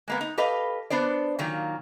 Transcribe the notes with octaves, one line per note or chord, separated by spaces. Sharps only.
G#3 A#3 B3
D#4
G4 A4 B4 D#5 F5
B3 D4 C5 D5
A#2 D#3 F#3 A#3